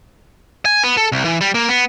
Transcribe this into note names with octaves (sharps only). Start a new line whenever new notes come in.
G#5
B3
A4
C2
E3
G3
A#3
B3